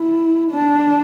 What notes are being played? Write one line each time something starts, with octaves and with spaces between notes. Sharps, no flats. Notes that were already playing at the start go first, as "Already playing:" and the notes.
Already playing: E4
D4